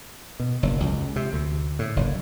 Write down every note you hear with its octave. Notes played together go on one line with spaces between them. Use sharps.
B2
F#1
C#2
C3
D2
A2
F#1